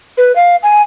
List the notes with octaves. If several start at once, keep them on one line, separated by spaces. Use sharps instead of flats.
B4
F5
G#5